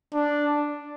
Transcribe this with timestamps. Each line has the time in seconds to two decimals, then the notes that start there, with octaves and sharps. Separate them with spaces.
0.14 D4